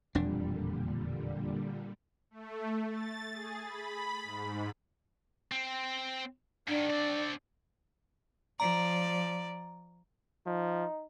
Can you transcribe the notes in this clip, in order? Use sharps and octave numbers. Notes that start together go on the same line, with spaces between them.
E1 F2 A#2 D3 G3 D4
A3
A6
G#4
B5
G#2
C4
G#2 D#3 D4
C4 D5
F3 D5 A#5
F3 D#4